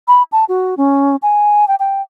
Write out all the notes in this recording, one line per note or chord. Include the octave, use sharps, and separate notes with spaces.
B5
A5
F#4
C#4
G#5
G5
G5